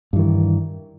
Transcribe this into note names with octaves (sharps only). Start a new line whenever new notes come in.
G2 D#3 E3